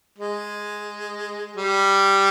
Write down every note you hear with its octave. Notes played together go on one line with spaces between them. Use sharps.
G#3
G3